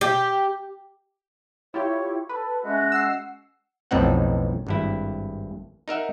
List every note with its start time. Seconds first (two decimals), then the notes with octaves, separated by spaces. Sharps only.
0.01 G4
1.74 E4 F4 G4 C#5
2.29 A4 B4
2.64 G#3 C#4 F#4 E5
2.92 F#5 E6 C7
3.91 B1 F2 A2 C4 D#4 F#5
4.67 G#1 G2 E4
5.88 D#4 A#4 E5 F#5